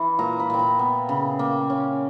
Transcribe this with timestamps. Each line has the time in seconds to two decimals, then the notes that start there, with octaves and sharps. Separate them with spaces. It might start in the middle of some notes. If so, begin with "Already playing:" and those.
Already playing: E3
0.19 A#2 A#5
0.40 B5
0.50 A#2 G5
0.59 A#5
0.79 B3
1.09 C#3
1.39 A#3 G5
1.70 C#4